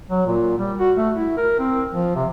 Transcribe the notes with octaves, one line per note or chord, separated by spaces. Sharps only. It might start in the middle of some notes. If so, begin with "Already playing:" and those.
F#3
A#2
G3
F#4
A3
E4
A#4
C4
F3
C3